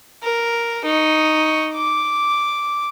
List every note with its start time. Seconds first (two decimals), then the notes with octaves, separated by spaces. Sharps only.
0.23 A#4
0.84 D#4 C#6
1.74 D6